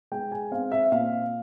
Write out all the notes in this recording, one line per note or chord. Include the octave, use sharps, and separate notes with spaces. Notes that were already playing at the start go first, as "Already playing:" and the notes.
G#3 G5
G#5
C4 F5
E5
A#2 F5